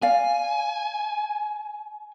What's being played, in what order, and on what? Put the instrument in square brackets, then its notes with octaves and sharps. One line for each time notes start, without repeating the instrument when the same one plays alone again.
[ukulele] D5 F5 [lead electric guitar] G#5